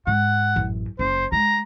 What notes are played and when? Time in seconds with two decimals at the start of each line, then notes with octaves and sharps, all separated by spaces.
0.07 G#2 F#5
0.56 A1 F#2
0.99 F#1 C#4 C5
1.32 G#3 A#5